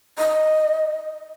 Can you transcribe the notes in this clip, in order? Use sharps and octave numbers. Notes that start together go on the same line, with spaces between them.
D#5